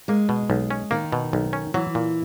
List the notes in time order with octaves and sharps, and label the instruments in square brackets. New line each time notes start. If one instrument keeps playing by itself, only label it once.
[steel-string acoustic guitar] G#3 [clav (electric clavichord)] A#3
[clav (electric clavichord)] B2
B1
C#4
[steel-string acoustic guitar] D#3 [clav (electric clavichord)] A#3
[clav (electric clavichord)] B2
B1
C#4
[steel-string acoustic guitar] E3 [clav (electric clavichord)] F#3
[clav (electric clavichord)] A#2